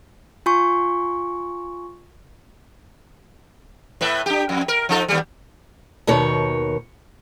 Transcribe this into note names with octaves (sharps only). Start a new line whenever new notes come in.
F4 G#5 C6 C#6
A2 B4 E5
D4 G4
F2
A#4
F3 D#4 A4
D#2 G3
D#2 B2 D#3 C#5